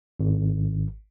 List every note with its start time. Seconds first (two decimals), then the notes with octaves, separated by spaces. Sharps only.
0.20 G#1